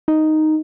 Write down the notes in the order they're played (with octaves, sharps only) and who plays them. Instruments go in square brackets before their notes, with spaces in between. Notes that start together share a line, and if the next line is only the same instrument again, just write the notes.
[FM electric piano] D#4